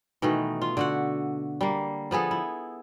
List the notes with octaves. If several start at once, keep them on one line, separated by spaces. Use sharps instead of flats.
B2 D#3 E3 A3
F4
D3 F#4 F#5
G3 A#3
F3 B3 G#4 A4
E4